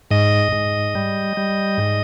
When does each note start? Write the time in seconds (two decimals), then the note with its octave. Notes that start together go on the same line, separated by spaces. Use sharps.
0.11 G#2 D#5
0.52 G#2
0.95 G3
1.37 G3
1.78 G#2